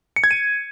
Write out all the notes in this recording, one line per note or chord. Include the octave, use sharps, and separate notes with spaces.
C#7
G#6
D#7